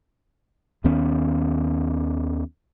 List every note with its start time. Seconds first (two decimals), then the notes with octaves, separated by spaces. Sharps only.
0.84 D#2 D#3 B3 C#4